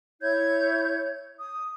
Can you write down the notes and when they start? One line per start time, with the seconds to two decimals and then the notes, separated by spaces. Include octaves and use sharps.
0.20 E4 C#5 G6 G#6
1.39 D#6